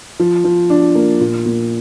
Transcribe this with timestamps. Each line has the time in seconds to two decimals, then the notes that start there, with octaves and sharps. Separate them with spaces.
0.19 F3
0.44 F3
0.70 D4
0.95 A#3
1.21 A#2
1.46 A#2